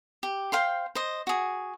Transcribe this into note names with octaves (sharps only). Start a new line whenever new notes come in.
G4
C5 F5 G5 C6
C5 D#5
F#4 G#4